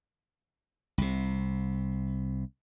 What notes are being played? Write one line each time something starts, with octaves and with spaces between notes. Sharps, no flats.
C2 C3